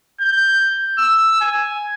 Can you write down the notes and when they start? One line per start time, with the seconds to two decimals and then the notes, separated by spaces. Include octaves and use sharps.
0.21 G6
0.99 E6
1.41 G#5